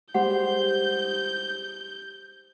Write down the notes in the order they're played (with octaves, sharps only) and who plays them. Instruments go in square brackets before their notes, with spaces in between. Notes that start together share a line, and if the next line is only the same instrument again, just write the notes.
[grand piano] G3 G#3 [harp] G4 C5 [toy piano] F#5 [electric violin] G6